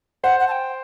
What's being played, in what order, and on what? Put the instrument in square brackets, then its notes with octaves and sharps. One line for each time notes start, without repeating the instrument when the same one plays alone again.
[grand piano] C5 [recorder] F#5
[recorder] F#5
A5
G5